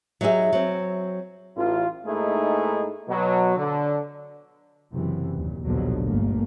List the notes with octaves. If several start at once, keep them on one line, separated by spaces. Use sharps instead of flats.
F#3 D#4 G4 G#4 E5
F#3 C4
A1 F4
G#2 A3 A#3 D#4 E4 G#4
B2 F#3
D3
F#1 F#2 C3 E3
D#2 A#2
A#1 D#2 B2 D3 F3 F#3
G1 A3 A#3